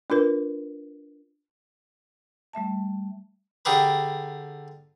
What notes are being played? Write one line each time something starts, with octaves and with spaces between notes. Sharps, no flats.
D4 F4 A#4 B4
G3 A3 E5 A5
D3 G4 G#4 A#4 B4